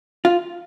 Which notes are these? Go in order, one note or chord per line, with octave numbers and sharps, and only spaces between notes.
F4